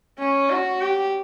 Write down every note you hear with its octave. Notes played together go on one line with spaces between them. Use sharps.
C#4
F#4
G4